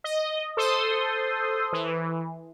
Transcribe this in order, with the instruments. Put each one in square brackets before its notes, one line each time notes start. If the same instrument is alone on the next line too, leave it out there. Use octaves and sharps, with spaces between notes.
[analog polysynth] D#5
A4 C5 C6 D#6
E3